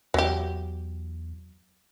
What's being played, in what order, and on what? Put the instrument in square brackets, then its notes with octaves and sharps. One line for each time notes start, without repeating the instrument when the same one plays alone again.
[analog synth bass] E2 [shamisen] F#3 G4